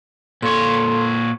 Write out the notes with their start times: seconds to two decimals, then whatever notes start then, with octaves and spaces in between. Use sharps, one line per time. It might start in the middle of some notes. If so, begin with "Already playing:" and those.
0.42 A#2 A4 C#5 C6